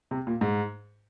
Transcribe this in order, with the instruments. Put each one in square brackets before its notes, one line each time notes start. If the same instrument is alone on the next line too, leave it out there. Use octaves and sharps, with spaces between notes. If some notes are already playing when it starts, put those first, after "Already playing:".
[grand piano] C3
A#2
G#2